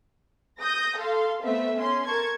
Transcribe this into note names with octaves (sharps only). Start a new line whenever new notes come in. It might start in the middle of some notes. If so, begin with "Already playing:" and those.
D#6 G6 A#6
A4 F5 C6
A3 B3 C4 E5
C#4 C6
A#4 A5 C#6 G#6